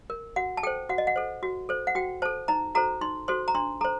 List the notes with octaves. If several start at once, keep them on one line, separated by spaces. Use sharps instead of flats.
A#4
F#4 F#5
A5
A4 C5 G5
F#4 F#5
D#5
F#5
A4 C5
F#4
A4 C5
F#5
F#4 G5
A4 C5 A5
D#4 A#5
F#4 A4 C5 A#5
D#4 C6
F#4 A4 C5 C6
A#5
D4 C6
A4 C5 A#5